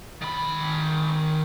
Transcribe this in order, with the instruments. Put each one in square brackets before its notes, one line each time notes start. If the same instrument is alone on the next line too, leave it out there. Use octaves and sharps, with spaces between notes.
[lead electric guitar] D#3 B5